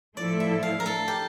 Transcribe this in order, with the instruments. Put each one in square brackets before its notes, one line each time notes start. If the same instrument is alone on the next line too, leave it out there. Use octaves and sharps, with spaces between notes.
[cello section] A2 F3 A3 E4 A4 [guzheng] D5
[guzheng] E5
F5
A#4
A4
G4